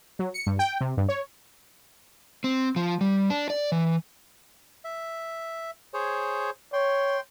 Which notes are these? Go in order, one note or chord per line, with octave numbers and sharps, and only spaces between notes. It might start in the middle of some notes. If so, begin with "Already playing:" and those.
F#3
C#7
G2
G5
C3
G2
C#5
C4
F3
G3
D4
D5
E3
E5
G#4 C5 C#5
C#5 G5 C6